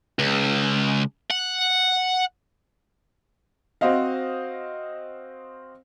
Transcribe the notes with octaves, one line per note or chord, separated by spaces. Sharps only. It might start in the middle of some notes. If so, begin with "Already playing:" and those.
C#2
F#5
C4 F#4 C5 D#5 F5